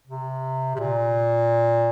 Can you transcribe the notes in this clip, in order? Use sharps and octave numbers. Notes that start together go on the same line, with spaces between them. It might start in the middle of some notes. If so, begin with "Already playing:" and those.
C3
C3
A#2